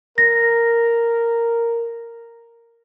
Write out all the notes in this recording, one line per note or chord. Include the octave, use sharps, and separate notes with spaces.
A#4 A#6